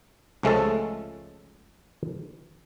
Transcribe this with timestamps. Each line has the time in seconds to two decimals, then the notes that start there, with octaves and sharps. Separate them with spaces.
0.43 C#2 F3 G#3 A3 C#4 A4